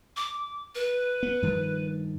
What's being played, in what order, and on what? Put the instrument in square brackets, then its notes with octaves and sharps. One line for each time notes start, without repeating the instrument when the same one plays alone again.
[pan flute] D6
B4
[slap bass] B3
G2 D#3 F3